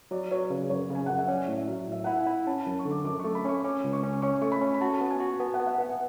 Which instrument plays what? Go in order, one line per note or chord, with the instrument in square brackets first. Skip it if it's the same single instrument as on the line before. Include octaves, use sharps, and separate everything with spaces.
[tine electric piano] F#3 [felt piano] D5
[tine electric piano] F#3 [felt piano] C#5
[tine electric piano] C#3 [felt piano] B4
[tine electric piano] F#2 [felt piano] C#5
[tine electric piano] C#3
[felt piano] G#5
[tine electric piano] F#2 [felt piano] F#5
[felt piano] E5
[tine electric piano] C#4 [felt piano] D5
[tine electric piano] A2
[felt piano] E5
[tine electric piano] F#3
[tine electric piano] A2 [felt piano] E5
[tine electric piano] E4 [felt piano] F#5
[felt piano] G#5
[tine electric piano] E4
[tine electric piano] C#4 [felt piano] A5
[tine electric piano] F#2
[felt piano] C#6
[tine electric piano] D3
[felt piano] D6
[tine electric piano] F#2 [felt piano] D6
[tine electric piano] A3 [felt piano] C#6
[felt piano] B5
[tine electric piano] C#4 [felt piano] C#6
[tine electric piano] C#4 [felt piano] D6
[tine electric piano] C#2
[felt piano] C#6
[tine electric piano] C#4
[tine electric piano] C#4 [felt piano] C#6
[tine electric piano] A3 [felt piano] C#6
[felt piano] B5
[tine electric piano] C#4
[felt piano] B5
[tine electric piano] F#4 [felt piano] A5
[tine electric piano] B3
[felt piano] G#5
[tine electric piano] F#4
[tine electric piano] B3 [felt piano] G#5
[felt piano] F#5
[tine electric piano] B3
[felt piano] E5
[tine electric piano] B3 [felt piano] F#5